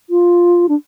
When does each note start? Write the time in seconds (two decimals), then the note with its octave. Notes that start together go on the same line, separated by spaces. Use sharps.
0.10 F4
0.69 D4